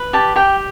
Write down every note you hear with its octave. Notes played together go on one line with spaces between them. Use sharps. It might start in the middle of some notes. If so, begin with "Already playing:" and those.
Already playing: B4
G4 A5
G4 G5